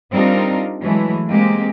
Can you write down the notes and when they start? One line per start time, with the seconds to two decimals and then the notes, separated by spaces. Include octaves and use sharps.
0.12 G3 C4 D4 D#4 F4 A#4
0.82 E3 F#3 G#3 A3
1.28 G#3 A#3 C4 G4